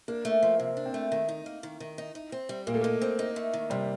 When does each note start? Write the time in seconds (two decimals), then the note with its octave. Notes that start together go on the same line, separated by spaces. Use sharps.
0.08 A#3 D4
0.25 A3
0.43 F3
0.60 C3
0.77 D4
0.86 C4
0.94 A3
1.12 D#3
1.28 D#4
1.46 A#3
1.63 D#3
1.80 D#3
1.98 D#4
2.15 D#4
2.32 C4
2.49 G3
2.67 A#2 A#3
2.74 A3
2.82 A#3 D#4
3.01 C4
3.19 D#4
3.36 A3
3.53 D#3
3.70 C3 G3